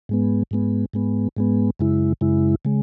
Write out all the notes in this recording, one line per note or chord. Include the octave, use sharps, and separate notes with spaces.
G#2 G#3 B3
G#2 G#3 B3
G#2 G#3 B3
G#2 G#3 B3
F#2 C#3 G#3 E4
F#2 C#3 G#3 E4
C#3 G#3